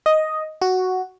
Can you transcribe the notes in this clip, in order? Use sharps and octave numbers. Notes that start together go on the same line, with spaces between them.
D#5
F#4